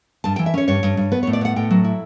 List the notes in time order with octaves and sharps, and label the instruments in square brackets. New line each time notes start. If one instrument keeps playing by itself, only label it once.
[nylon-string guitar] G2 A5
E3 G5
E5
C#4 C#5
G2 C#5
G2
G2
B3 B4
A2 C#5
D5
B3 F#5
A2 G5
F#3
E4